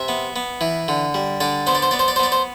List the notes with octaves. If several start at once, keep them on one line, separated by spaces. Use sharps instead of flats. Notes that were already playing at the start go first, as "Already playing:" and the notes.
Already playing: C3 E5
B3
B3
E3
D3
G3
D3 D5
B3 C5
D5
C5
B3 D5
C5
D5
C5
B3 D5
C5